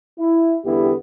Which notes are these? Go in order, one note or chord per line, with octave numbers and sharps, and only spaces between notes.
E4
E2 D3 G3 B3 E4 G4